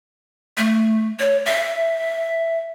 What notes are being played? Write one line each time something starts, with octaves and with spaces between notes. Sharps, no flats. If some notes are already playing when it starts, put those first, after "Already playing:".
A3
C#5
E5